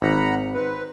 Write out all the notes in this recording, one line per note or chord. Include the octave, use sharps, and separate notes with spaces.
G#1 F#5 A#5 B5
C4 B4